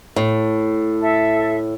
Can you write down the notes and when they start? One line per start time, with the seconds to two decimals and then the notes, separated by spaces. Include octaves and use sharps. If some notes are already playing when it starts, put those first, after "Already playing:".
0.16 A2
1.00 A4 E5